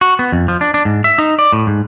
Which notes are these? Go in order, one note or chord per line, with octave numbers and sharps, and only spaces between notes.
F#4
B3
F2
F3
D4
D4
G#2
E5
D#4
D5
A2
G#2